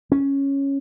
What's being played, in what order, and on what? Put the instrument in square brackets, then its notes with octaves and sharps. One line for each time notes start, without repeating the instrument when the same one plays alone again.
[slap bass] C#4